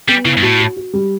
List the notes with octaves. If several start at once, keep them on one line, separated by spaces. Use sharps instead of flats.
G3 B3
C#3 E4
G2
A2 F#4
F#4
F#4
G3